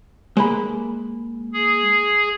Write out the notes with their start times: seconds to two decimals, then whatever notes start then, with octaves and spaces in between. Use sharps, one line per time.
0.37 G#3 A#3 B5
1.53 G#4